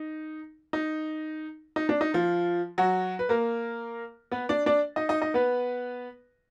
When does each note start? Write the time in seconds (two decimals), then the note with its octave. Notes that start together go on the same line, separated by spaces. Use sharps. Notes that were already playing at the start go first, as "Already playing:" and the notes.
Already playing: D#4
0.73 D#4
1.76 D#4
1.89 D4
2.01 D#4
2.14 F3 F4
2.78 F#3 F#4
3.19 B4
3.29 A#3 A#4
4.31 B3 B4
4.49 D4 D5
4.66 D4 D5
4.96 D#4 D#5
5.09 D#4 D#5
5.22 D#4 D#5
5.34 B3 B4